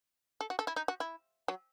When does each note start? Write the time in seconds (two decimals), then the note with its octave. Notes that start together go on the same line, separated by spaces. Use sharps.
0.41 A4
0.50 F#4
0.59 A4
0.67 E4
0.76 D#4
0.88 F#4
1.00 E4
1.48 F#3